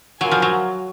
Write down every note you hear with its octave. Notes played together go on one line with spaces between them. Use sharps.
F#3 F4 A#4 F5 G#5
F3
F#3